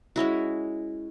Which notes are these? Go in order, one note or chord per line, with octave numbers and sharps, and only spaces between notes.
G#3 C#4 E4 F#4